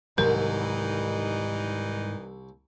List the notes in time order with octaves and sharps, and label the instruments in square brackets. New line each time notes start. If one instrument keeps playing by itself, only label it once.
[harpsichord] C2 [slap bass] G#2 D#3 F#3 [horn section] E3 G3 D#4 [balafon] A#4